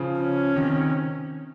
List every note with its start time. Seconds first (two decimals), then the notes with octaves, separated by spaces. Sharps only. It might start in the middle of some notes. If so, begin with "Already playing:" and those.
Already playing: C#3 F3
0.20 C#4
0.56 C3 D#3